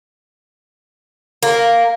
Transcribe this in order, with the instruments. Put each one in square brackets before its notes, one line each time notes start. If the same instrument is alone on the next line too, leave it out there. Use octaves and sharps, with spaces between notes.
[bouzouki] A#3